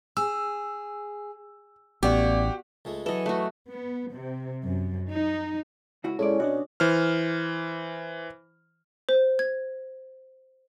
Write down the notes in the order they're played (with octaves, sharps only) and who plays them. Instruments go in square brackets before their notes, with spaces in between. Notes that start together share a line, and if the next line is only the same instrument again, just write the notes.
[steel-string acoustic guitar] G#4 [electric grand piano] E6
[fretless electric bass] A1 [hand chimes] B3 D5 [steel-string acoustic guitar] F#4 [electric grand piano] G4
[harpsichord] C#2 G#3 A3
[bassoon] E3 [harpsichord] F#3 G#4 [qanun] A4 D#5
[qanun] A3 F#4
[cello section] B3
C3
F#2
D#4
[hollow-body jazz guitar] C#2 E4 F#4
[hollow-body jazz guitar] A#2 G#3 D5 [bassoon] C#4 [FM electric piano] E4 G#4 A4
[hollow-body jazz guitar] B2 F#4 [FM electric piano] D4 D5 D#5
[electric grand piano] E3 C5 F6
[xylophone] C5
G#6